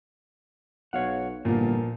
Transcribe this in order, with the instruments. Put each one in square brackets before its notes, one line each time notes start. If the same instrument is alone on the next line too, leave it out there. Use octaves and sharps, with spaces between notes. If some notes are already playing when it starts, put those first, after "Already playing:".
[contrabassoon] B1 [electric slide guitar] C#5 F5 F#5
[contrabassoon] G1 [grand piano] A#2 F3 [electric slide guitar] A#3